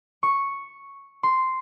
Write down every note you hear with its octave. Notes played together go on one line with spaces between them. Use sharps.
C#6
C6